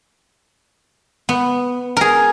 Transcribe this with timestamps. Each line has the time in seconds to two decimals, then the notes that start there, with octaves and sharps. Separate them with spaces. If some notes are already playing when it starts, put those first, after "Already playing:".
1.29 B3
1.97 G#4 A#4